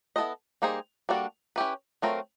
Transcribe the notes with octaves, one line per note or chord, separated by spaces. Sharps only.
B3 E4 A4 C5 D#5
G3 A#3 D#4 G#4 C5
G3 A#3 D4 F#4 A4
C#4 E4 G4 B4
F#3 A3 C4 F4 A#4